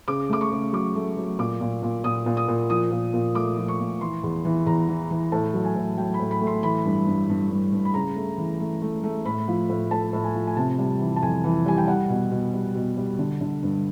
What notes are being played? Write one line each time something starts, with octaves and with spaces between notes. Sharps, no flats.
C#3 D6
A3 D6
C#6
C#3
F#3 D6
A3
F#3
A#2 D6
A#2
A#2
A#2 D#6
A#2
D#6
A#2
F3 D#6
A#2
A#2
A3 D6
F3
C#6
A#2
E3 C6
E2
E3
E2 A#5
E3
E3
A2 A5
F#3
G#5
A2
F#3 G5
B5
A2
B5
A3
C6
E3 B5
G2
G2
G2
G2
G2
B5
C#3 A#5
A3
E3
A3
A3
A3
A2 B5
F3
A2
A2 A5
A2
G#5
F3
G#5
C3 A5
G3
E3
A5
F2 G#5
E3
G3 G#5
G5
G3 F#5
B2
B2
G3
B2
G3
D3
D3
G2